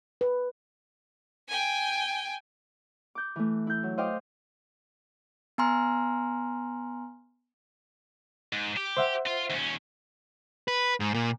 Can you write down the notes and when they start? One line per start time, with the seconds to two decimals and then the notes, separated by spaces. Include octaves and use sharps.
0.21 B4
1.48 G5 G#5
3.15 D6 G6
3.36 E3 A3
3.67 E4 G6
3.83 F#3
3.98 C5 D#5 F5 G5 D6
5.58 B3 G#5 A#5 C6 F6
8.52 G#2
8.77 G4
8.97 C5 E5 F#5
9.27 F4
9.50 D#2 C#4
10.68 B4
11.00 G#2
11.14 A#2